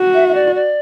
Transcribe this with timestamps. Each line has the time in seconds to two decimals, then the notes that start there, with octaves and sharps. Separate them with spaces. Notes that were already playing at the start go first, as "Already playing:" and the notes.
Already playing: F#4
0.14 E5
0.28 E5
0.34 D5
0.55 D5